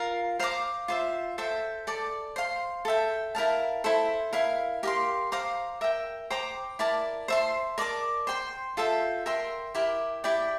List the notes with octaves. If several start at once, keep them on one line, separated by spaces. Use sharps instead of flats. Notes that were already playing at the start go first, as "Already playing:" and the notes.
Already playing: F4 A#4 F5 A#5
C5 F5 A#5 D6
F4 C5 E5
A4 C5 E5 G5
A4 D5 A5
C5 F5 C6
A4 E5 G5
E4 A#4 F5 A5
E4 A4 C5
E4 A#4 F5
G4 A#4 F5 C6
C5 F5 A#5 D6
A#4 E5 G5
C5 G5 A#5 D6
E4 A#4 D5 A5
C5 E5 A5 C6
A#4 D5 A5 D6
C5 G5 C6
F4 A4 E5 G5
A#4 E5 G5 C6
E4 G4 A#4
E4 G4 D5 G5